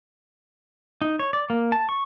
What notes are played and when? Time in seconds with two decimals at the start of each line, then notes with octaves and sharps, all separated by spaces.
1.02 D#4
1.19 C#5
1.33 D5
1.50 A#3
1.72 A5
1.89 C#6